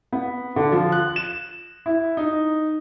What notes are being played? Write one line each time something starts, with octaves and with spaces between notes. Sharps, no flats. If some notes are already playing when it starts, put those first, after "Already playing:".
B3
D3
F3
F#6
E7
E4
D#4